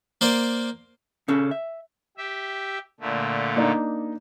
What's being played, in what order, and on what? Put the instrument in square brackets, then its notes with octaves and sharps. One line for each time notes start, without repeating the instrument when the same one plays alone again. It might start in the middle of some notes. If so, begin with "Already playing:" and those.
[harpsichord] A#3 C5 D5
[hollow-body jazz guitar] C#3 C#4 A4
E5
[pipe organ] G4 E5
A#2 D3 A3
[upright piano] A#3 D4 D#4